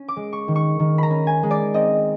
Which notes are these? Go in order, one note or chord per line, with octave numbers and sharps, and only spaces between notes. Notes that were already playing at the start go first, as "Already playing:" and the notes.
Already playing: C#4
D6
G#3
C#6
D#3
C#6
D#3
A#5 B5
C#4
G#5
G#3
D5
C4 D#5